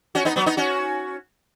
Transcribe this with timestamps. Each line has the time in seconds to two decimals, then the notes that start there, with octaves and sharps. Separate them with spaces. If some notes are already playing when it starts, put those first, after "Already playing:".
0.15 C#4 F#4
0.25 B3 D#4
0.36 F#3 B3
0.46 B3 D#4
0.57 C#4 F#4